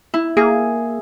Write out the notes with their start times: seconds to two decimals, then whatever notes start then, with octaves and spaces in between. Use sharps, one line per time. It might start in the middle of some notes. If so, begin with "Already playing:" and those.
0.14 E4
0.37 A#3 G#4